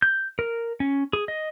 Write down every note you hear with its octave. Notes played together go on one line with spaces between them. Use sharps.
G6
A#4
C#4
G#4
D#5